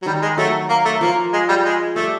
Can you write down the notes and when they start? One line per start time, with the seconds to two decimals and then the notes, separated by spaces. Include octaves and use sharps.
0.02 F#3
0.06 D#3 G3 D#4
0.22 G#3
0.38 F#3 A3 F#4
0.70 A#3
0.85 A3
1.01 F3 A#3 F4
1.33 G#3
1.49 G3
1.64 G#3
1.96 G3 A3 G4